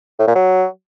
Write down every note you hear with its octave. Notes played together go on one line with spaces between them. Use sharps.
A2
A#2
F#3